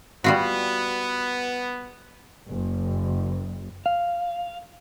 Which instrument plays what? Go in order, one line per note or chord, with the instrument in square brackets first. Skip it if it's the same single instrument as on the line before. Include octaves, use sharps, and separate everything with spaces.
[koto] G3 F4 F#4 [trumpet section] B3
[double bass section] F#1
[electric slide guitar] F5